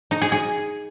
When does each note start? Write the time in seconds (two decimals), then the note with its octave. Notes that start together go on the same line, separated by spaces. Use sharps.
0.11 D#4
0.22 G#4
0.32 G#4